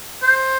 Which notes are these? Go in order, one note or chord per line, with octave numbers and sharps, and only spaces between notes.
C5